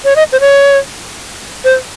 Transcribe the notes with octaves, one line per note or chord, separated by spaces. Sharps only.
C#5
D#5
C5
C#5
C5